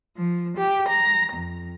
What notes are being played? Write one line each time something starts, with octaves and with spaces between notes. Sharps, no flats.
F3
G4
A#5
F2